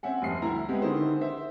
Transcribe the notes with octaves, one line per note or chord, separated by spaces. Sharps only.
C4 C#4 E5 F#5 G#5
F1 G2 C7
D2 E4 E5 A#5
G#3 B3 C4 G4 G#4
D3 D#3 D#4 E4 G#4 C5
C5 E5